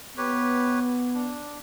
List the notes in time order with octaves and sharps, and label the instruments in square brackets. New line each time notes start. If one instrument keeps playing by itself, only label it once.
[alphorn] B3 [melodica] G4 B4 C#5
[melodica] D4